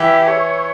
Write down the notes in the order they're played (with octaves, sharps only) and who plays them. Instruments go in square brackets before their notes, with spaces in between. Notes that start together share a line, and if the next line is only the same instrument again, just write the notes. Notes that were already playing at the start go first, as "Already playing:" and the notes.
Already playing: [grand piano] E3 E4 [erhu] G4
[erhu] C#5